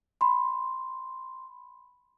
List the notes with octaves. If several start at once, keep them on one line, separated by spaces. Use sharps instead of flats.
B5 C6